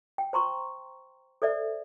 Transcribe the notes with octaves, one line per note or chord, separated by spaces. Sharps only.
G5
C5 A#5 C6 C#6
A4 C5 D5 E5